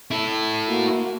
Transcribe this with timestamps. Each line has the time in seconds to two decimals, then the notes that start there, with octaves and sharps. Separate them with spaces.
0.11 E4 A4
0.67 A#3 F#4